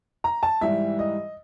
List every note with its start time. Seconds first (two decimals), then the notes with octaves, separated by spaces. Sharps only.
0.24 A#5
0.43 A5
0.61 G#2 E3 G3 E5
0.99 D#5